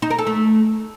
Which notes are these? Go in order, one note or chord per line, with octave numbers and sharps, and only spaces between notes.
D#4
A#4
A4
A3